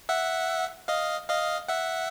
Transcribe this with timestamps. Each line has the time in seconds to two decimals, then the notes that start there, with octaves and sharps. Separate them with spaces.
0.09 E5 F#5
0.88 D#5 F5
1.29 D#5 F5
1.68 E5 F#5